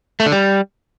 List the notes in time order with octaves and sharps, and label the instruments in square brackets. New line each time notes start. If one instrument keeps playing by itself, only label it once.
[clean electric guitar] A3
D3
G3